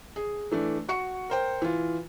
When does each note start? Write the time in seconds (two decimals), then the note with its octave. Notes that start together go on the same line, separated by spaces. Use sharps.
0.16 G#4
0.51 E3 A3 D4
0.88 F#4 C#6 C#7
1.30 A#4 C5 G5
1.62 E3 F4